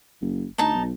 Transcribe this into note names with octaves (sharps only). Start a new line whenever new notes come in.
F#1
D2 D#4 A5
B1